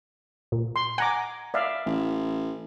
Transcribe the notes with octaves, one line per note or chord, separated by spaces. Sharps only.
A#2
C6
F#5 G#5 A#5 D6
D5 E5 F5
A1